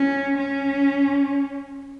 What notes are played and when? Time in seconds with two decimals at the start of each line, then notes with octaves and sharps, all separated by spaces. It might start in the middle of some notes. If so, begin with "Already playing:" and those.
Already playing: C#4
0.37 C#4